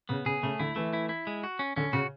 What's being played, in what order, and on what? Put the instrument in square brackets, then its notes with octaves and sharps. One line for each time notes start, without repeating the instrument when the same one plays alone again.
[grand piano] C#3 [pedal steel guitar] B3
[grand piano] C#3 [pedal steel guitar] G#4
[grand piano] C#3 [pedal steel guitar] A3
[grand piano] D3 [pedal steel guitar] E4
[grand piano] E3 [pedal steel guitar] A3
[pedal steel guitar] E4
E4
G#3
F#4
C#4
[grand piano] D3 [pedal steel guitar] C#4
[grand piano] C#3 [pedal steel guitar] F#4